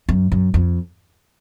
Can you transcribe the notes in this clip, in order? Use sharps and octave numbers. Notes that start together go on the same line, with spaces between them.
F#2
F#2
F2